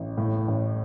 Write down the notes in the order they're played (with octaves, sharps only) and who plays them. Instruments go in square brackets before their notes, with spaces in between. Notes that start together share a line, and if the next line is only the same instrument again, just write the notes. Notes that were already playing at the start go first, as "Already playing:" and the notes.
Already playing: [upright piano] A1
A2
A1